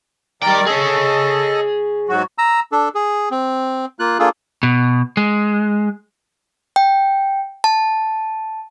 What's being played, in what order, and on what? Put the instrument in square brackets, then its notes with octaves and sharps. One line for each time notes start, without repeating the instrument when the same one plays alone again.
[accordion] D#3 A#4 D5 [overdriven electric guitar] G3 G5
[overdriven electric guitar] G#4 C#5 [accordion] A4 D#5
[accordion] G#2 F#3 F#4
[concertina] A#5 E6
D4 A4
G#4
C4
A#3 F4 F#6
A#3 D4 F4 G#4 A4
[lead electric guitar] B2
G#3
[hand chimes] G5
A5